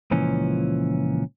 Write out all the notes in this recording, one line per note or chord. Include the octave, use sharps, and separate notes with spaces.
C#2 A#2 E3 F3 C#4